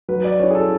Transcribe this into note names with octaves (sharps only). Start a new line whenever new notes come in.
F#3 B4
D5
C#4 E4 C#5
G#4
A4